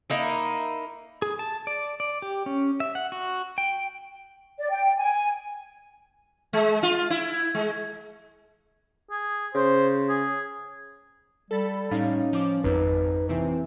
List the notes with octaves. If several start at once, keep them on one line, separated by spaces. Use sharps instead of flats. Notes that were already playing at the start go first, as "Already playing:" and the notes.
A#3 D#4 E4
G#4
A5
D5
D5
G4
C#4
E5
F#5
F#4
G5
D5
G5
G#5
G#3
F4
E4
G#3
G#4
C#3 C5
G#4
G3 A4 B5 A6
A2 G3 C#4 D#4 F5
F3 D6
G#1 F2 D#4 B4
A#1 C3 E3 C4